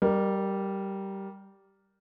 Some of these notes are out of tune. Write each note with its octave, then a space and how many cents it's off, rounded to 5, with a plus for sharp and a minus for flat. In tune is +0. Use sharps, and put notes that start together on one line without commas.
G3 -10 A#4 +0 D5 +45